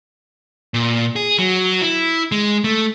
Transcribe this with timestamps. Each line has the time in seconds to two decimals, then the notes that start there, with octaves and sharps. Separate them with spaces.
0.74 A#2
1.16 G#4
1.39 F#3
1.82 E4
2.32 G#3
2.64 A3